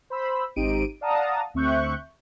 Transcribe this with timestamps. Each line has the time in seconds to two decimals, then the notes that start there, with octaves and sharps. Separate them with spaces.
0.10 C5 B5 E6
0.56 G#1 C4 D#4 G4 D7 D#7
1.01 D5 F5 F#5 A5 A#5 D#6
1.54 D2 C4 E5 C#6 F#6 G6